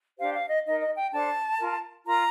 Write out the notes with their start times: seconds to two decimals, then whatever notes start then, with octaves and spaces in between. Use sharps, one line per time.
0.18 D4 G4 C5 F5
0.34 F5
0.49 D#5
0.65 D#4 A#4 D#5
0.80 D#5
0.96 G5
1.12 D4 A4 C5 A5
1.58 F4 A#4
2.05 F4 A#4 A#5